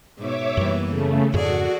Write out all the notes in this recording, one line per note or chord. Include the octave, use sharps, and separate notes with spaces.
G#2 B2 C#5 E5 D6
F#2 E3 G3 A#3 B3
C#3 A3
F2 G#2 C#3 F#4 G#4 A4 D5